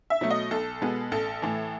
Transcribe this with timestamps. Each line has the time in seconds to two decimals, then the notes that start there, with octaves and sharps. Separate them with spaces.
0.10 E5
0.21 B2 F#3 A3
0.30 D#5
0.51 B1 A4
0.82 B2 G#3 B3
1.11 A1 A4
1.42 A2 E3